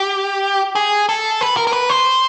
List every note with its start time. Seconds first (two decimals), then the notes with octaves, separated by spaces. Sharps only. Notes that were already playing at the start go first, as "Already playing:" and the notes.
Already playing: G4
0.75 G#4
1.09 A4
1.41 B4
1.57 A#4
1.67 A#4
1.73 B4
1.89 C5